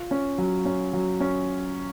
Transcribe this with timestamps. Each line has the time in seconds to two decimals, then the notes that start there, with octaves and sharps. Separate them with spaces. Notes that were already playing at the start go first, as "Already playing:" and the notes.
Already playing: F4
0.11 C#4
0.38 F#3
0.65 C#4
0.93 F#3
1.20 C#4